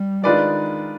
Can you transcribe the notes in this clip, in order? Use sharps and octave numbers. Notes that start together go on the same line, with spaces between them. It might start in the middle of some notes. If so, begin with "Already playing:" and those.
Already playing: G3
D#3 G#3 D4 F4 B4 D5